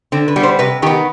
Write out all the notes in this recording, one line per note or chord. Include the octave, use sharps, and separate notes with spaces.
D3 C4
B4
G3 B3
C5
C3 B4
D#3 B3 G4